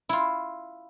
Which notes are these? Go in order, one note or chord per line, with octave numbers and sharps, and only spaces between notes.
E4 F4